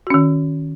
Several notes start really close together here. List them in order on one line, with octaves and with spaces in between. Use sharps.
F#4 C#4 D#3